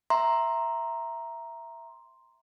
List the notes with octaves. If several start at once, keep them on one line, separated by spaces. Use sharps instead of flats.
E5 A#5 C6